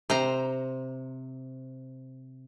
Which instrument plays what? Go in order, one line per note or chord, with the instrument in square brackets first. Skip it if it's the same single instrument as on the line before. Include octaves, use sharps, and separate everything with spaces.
[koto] C3 C5 A#5